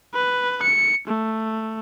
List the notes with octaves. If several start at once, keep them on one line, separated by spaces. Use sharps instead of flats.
B4
C#7
A3